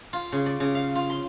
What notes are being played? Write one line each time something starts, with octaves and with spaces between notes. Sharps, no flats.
F4
C#3
D5
C#3
F5
F4
C6